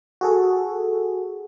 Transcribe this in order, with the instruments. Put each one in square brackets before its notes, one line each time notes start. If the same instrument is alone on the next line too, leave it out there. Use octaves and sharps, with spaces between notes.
[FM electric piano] F#4 G#4 A4